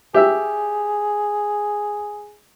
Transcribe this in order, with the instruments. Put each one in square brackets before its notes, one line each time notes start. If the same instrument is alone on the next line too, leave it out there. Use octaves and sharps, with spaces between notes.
[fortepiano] G4 E5 E6 [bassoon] G#4